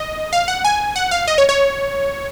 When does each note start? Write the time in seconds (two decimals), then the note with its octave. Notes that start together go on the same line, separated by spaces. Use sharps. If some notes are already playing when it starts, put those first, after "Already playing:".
Already playing: D#5
0.33 F5
0.48 F#5
0.64 G#5
0.96 F#5
1.11 F5
1.28 D#5
1.38 C#5
1.49 C#5